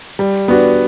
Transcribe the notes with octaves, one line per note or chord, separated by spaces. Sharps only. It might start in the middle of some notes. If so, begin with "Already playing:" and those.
G3
B3 D4 F#4